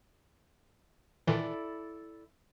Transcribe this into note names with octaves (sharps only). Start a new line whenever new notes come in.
A#2 D#3 E3 E4 A4 D5